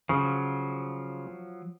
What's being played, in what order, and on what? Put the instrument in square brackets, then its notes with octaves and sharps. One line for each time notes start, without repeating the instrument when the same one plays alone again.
[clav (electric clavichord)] C#3 [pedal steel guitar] F3 F#3